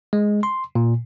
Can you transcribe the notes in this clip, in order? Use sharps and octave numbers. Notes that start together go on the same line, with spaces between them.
G#3
C6
A#2